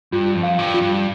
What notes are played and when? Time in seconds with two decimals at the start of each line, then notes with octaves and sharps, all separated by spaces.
0.12 G2 F4
0.35 F2
0.43 F5
0.59 G2
0.74 F4
0.82 G2